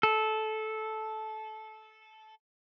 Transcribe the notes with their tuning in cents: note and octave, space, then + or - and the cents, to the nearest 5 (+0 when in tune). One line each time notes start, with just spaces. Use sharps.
A4 -15